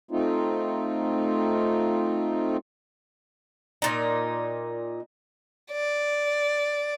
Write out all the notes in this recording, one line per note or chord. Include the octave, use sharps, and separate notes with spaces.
A3 C4 D#4 F4
A#2 D#4
D5